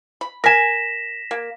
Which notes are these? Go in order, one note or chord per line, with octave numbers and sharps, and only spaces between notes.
B5
A#4 G#5 A#6 B6 E7
A#3